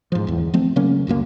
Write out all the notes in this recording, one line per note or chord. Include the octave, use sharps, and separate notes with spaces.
G#2 F3
D1 E2
F3 A3 C4
C#3 F#3 A#3 C#4
D#1 C#2 F#2 A#3